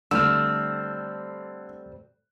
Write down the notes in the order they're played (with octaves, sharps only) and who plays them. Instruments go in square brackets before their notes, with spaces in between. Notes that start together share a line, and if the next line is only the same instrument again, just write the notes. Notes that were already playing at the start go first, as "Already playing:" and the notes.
[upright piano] D3 [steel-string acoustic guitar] G3 A3 C4 [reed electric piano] E6 F6